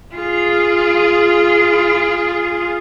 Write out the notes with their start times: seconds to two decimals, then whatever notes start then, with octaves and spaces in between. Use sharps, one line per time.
0.15 F4 G#4